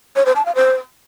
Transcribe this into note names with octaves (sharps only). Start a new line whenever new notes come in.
C#5
C5
A5
F5
C5